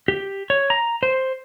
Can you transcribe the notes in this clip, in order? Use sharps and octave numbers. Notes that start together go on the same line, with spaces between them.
G4
C#5
A#5
C5